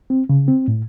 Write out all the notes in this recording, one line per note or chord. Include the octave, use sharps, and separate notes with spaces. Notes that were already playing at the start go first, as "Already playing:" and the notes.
C4
C#3
C4
A2